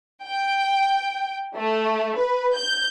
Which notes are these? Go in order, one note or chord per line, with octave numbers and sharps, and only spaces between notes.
G5
A3
B4
G6